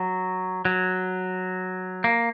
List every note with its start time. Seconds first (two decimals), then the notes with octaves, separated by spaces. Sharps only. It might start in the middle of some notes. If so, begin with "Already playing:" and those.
Already playing: F#3
0.65 F#3
2.04 A#3